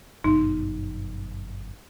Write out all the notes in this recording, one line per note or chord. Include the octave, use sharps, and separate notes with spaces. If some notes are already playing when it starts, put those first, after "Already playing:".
G1 F#2 B2 D#4